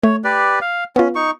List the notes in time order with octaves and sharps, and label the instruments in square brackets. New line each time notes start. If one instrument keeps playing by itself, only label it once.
[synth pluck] A3 [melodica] C#5
[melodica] G4 B4 D5
F5
[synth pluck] B3 F4 [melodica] C#4
[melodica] D#4 C#6